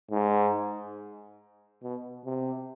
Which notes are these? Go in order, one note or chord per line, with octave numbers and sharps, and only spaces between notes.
G#2
B2
C3